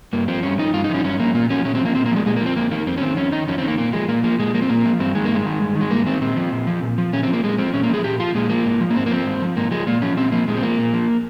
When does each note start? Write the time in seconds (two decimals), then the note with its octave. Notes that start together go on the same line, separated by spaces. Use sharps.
0.13 G2 A#3
0.28 F3 C4
0.43 G2 C#4
0.58 F3 D#4
0.74 G2 F4
0.84 D#4
0.89 F3 C#4
1.00 D#4
1.04 G2 C#4
1.19 F3 A#3
1.34 A#2 A#3
1.50 F3 C#4
1.65 A#2 C#4
1.75 C4
1.80 F3 A#3
1.95 A#2 C4
2.06 A#3
2.11 F3 G#3
2.26 A#2 G#3
2.36 A#3
2.41 F3
2.46 C4
2.56 F2 A#3
2.71 D#3 A#3
2.87 F2 C4
2.97 C#4
3.02 D#3 C4
3.17 F2 C#4
3.32 D#3 D#4
3.47 F2 C#4
3.58 C4
3.63 D#3
3.68 A#3
3.78 A#2 A#3
3.93 F3 G#3
4.08 A#2 A#3
4.24 F3 A#3
4.39 A#2 G#3
4.54 F3 A#3
4.62 C4
4.69 A#2 A#3
4.85 F3
5.00 G2 C4
5.15 D#3 G#3
5.25 A#3
5.30 G2 G#3
5.46 D#3
5.61 G2
5.75 D#3
5.81 G#3
5.91 G2 A#3
6.06 D#3 C4
6.21 A#2 C4
6.37 F3
6.52 A#2
6.67 F3
6.82 A#2
6.98 F3
7.13 A#2 C#4
7.23 C4
7.28 F3
7.33 A#3
7.43 A#2 G#3
7.58 F3 C4
7.74 A#2 C#4
7.83 A#3
7.89 F3 G#4
8.04 A#2 G4
8.20 F3 F4
8.34 A#2 G#3
8.50 F3 A#3
8.65 G#2
8.81 F3
8.90 A#3
8.95 G#2 C4
9.06 A#3
9.11 F3 C4
9.26 G#2
9.42 F3
9.57 G#2 A#3
9.71 F3 G#3
9.87 A#2 A#3
10.02 F3 C#4
10.17 A#2 C4
10.32 F3 A#3
10.48 A#2 G#3
10.57 C4
10.62 F3 A#3
10.79 A#2
10.94 F3